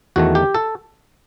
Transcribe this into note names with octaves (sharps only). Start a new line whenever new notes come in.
E2 D#3 A3 F#4
G4
A4